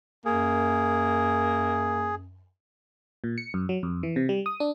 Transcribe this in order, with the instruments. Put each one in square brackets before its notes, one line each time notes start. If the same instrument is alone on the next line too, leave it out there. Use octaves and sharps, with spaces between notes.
[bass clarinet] F#2 [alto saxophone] A#3 [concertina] G#4
[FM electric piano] A#2
C#7
F#2
F#3
F2
E3
C3
G3
D#6
D4